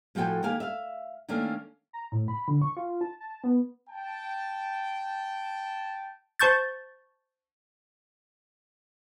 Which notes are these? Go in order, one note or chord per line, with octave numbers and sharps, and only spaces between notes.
A2 F3 F#4 A4 G5 G#5
D#3 A#3 G4 F5 G#5
E5 F5
D#3 A3 A#3 C#4 D4
A#5
A2
B5
D3
C#6
F4
A5
A5
B3
G5 A5
C5 A5 C#6 G6 A6